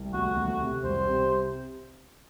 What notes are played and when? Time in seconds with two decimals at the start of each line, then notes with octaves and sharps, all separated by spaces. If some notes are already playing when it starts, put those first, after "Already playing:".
Already playing: C2
0.14 D2 F#4
0.37 D2
0.60 C3
0.84 C2 C5
1.07 C3